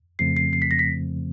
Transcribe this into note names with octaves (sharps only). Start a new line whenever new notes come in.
F2 C#3 F3 A3 C4 C7
C7
C7
B6
A#6
B6